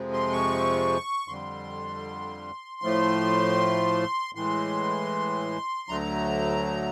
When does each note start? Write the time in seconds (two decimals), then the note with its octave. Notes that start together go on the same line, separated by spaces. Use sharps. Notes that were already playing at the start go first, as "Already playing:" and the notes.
Already playing: F2 C3 F3 G#3
0.13 C6
0.32 C#6
1.28 F2 D3 G3 C6
2.82 A2 F3 A3
4.35 A2 E3 G#3 C6
5.89 D2 D3 F#3 A3 A#5